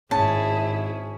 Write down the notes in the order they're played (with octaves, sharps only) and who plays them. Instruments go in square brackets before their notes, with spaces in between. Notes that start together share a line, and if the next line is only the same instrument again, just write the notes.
[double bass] G#1 [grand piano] C#4 [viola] E4 G#4 [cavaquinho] A5